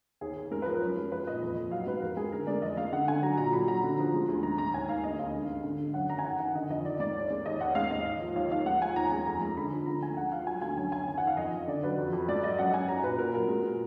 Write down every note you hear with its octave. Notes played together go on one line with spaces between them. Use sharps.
D#2 G#4
D#2
G#3 A#4
B4
F3 A#4
F#2
G#3
F3 B4
A#2 D#5
F2
F2
F#3 F5
G#2 B4
F2 A#4
G#3 G#4
D3 A#4
G#3 D5
F2 D#5
G#3 F5
D3 F#5
D3 G#5
F#3 A#5
A#2 A#5
F#3 B5
F#3 A#5
D3
F3
G#3
D2
G#2 A#5
G#2 A#5
D#2 G#5
D#2 F5
D2 D#5
D2 F5
G#3
G#2
D3
D3
F#2 F#5
D#3 A#5
G#5
D#3 F#5
D#3 F#5
D3 D#5
F2 D#5
D#3 D5
G#2 D5
D#2
G#3
D#2 D#5
D#2 F#5
G#3 F5
G#2 D#5
D#2
F3
D#2 F5
D#2 F5
G#3 F#5
F3 G#5
D#2 A#5
G#3 G#5
F2 A#5
G#3 A#5
D3 B5
F3
D3 A#5
D2 G#5
G#3 F#5
F3 F5
F#3 G#5
D2 G#5
F#2 G#5
F#2 G#5
D#3 G#5
F#5
D#3
F5
F2 D#5
F2
D3 D5
F#3 B4
F2
F2
G#2 D5
F#3 D#5
F#2 F#5
F#2 G#5
F#3 A#5
A#2 B4
A#2 A#4
F#3 A#4
G#3
A#2